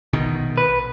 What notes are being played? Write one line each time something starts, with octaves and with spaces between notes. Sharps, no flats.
A#1 B2 D#3
B4